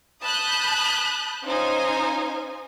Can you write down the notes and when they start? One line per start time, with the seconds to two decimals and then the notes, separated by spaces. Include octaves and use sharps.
0.22 A5 B5 D#6 F#6 G6
1.44 C#4 D#4 F4 C5 G#5